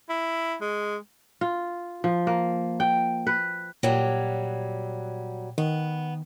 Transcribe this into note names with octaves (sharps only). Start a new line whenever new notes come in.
E4
G#3
F4
F3
A#3
G5
B4
A#2 F#3 G3
D#3 B3